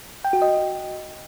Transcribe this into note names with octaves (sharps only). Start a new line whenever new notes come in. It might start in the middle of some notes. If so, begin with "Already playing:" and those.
G5
F#4
D#5